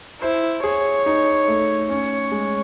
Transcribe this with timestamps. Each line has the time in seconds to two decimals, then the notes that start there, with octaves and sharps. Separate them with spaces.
0.22 E4 C5
0.64 G#4 C#5
1.06 D#4
1.48 A3
1.89 C#4 C#5
2.31 G#3